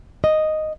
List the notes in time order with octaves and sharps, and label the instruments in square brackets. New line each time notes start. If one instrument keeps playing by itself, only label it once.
[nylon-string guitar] D#5